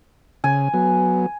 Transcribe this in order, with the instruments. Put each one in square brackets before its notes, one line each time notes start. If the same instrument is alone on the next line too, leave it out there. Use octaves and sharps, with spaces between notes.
[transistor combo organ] C#3 [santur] G#5
[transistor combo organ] F#3 B3